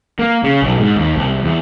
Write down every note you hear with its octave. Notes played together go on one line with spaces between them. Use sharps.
A#3
C#3
B1
G#2
D#2
C2
E2